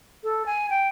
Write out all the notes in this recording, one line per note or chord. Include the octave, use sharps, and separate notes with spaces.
A4
G#5
G5